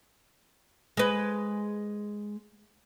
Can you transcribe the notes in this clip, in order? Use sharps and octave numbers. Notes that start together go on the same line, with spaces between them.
G#3 B4